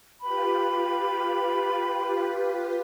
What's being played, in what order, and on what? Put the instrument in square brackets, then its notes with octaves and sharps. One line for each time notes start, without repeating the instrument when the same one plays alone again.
[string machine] F4 G4 B4 [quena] B5